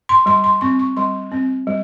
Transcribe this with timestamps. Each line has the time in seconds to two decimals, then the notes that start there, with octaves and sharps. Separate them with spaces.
0.09 C6
0.26 G3 C6
0.44 C6
0.61 C4 C#6
0.79 C#6
0.97 G3 C6
1.32 C4
1.67 G3